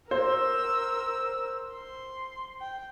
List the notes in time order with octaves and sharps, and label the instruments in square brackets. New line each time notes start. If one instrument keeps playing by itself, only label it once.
[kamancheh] A#4 E6 [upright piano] C5
[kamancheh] C6
G5